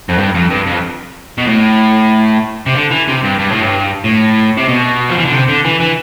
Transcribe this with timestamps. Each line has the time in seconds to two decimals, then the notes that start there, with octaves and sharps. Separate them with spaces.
0.09 F2
0.18 G2
0.34 F2
0.50 G2
0.66 F2
1.38 B2
1.47 A2
2.66 C3
2.75 D3
2.91 E3
3.08 C3
3.24 G2
3.39 G2
3.50 A2
3.61 G2
4.04 A2
4.57 C3
4.68 B2
5.09 F3
5.18 E3
5.25 D3
5.32 C3
5.49 D3
5.64 E3
5.80 E3